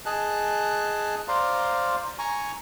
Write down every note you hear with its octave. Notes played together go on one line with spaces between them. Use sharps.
G#4 D#5 G#5 A5 F#6
C5 D5 F5 A#5 C6
G#5 A#5 C#6